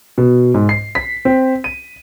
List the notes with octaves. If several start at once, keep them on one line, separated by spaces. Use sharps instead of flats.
B2
G#2
C7
B6
C4
D#7